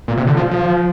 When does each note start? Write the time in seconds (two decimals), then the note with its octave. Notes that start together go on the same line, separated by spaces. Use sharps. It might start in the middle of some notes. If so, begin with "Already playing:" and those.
0.08 A#2
0.17 C3
0.27 D3
0.37 F3
0.51 F3